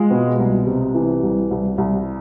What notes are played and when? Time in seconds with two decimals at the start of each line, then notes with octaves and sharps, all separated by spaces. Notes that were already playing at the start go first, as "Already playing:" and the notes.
Already playing: G#3 F4
0.11 B2
0.39 C2
0.67 C3
0.95 E3
1.23 C2
1.51 C2
1.78 C2